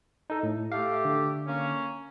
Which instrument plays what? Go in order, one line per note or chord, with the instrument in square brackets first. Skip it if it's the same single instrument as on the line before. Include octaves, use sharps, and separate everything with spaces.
[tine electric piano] D#4 A4
A2
[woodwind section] A3 G4 [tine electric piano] F5
[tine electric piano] D3
[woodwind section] A#3 C#4